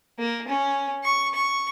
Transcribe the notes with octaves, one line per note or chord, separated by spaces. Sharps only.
A#3
C#4
C#6
C#6